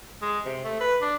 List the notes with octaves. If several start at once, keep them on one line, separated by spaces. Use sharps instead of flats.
G#3
C3
A3
B4
D4